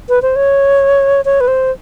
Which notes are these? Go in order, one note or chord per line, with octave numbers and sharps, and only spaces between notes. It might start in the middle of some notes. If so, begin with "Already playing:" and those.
B4
C5
C#5
C#5
B4
C5